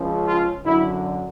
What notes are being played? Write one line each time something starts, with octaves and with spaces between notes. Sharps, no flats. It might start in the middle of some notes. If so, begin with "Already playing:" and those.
Already playing: C#2 C#3 F3
F4
F#2 D3 F#3 E4